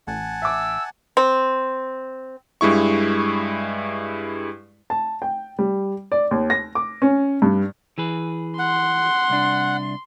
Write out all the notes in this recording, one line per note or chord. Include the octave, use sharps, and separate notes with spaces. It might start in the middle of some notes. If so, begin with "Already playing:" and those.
A1 F#5 G#5 A5
E5 D6 E6
C4
G2 G#3 E4 C#6
A5
G5
G3
D5
D#2
A#6
D6
C#4
G2
E3 G#4 B4
F#5 C6
C2 D4